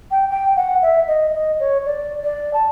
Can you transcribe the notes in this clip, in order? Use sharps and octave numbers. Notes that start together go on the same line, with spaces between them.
G5
G5
F#5
E5
D#5
D#5
C#5
D5
D5
A5